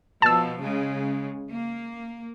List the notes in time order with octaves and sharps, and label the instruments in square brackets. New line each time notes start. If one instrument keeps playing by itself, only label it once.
[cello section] B2 F3 [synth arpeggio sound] A5 E6
[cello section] C#3 G#3
A#3